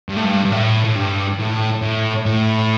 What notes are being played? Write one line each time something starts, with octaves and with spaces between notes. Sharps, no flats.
G2
A2
G2
G2
A2
A2
G2
A2
A2
A2